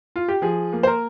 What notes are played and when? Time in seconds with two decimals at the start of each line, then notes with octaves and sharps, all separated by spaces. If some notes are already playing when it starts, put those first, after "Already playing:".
0.16 F4
0.28 G4
0.42 F3 G#4
0.73 A#3
0.83 C5
0.87 A#4